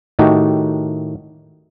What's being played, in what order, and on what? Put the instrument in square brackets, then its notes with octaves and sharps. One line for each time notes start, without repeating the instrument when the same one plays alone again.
[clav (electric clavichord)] A2 D#3 A3 D#4 F#4 G4